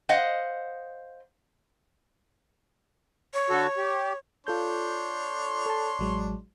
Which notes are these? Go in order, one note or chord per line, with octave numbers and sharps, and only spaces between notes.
C5 D#5 F5 F#5
C#5
D3 F#4 A4
G4
D4 F4 A4 C#5 C6 G6
A4 A5
A1 F#3 G#3